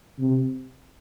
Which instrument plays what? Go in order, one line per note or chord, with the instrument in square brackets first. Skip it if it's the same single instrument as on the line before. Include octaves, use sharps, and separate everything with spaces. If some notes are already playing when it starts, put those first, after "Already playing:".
[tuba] C3